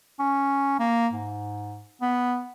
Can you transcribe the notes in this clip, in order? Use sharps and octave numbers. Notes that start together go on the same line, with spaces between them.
C#4
A#3
G#2
B3